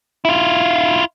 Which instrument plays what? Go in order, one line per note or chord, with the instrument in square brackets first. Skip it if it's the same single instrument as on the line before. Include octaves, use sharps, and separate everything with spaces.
[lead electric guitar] E4 F4